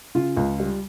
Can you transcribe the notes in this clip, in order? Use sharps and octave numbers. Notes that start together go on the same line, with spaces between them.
C#3 F4
C#2
G3